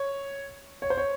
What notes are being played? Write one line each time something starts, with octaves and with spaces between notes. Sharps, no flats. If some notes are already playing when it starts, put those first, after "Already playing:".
Already playing: C#5
C#5
C5
C#5